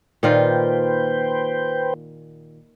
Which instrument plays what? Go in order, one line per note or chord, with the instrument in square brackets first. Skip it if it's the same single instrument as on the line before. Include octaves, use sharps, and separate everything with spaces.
[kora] A#2 D#3 F4 [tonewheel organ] B4 C5 G5